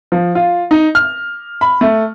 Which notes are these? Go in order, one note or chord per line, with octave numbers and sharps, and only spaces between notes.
F3
F4
D#4
F6
B5
A3